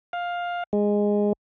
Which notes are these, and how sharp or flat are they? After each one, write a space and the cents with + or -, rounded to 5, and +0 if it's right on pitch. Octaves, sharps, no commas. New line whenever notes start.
F5 +10
G#3 -10